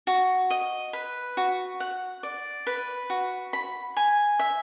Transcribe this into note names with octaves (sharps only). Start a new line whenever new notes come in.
F#4
D#5
B4
F#4
F#5
D5
B4
F#4
B5
G#5
E5